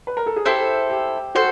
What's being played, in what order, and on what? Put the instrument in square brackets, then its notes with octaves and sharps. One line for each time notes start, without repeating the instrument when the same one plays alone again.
[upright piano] B4
A#4
A4
G#4
[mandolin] E4 A4 C5 [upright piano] G4
[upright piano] G4
[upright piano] F#4 [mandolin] A4 C5